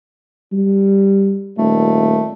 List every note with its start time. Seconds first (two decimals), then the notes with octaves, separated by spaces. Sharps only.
0.52 G3
1.58 D#1 A3